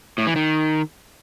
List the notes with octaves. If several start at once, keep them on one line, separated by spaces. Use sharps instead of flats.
A2
E3
D#3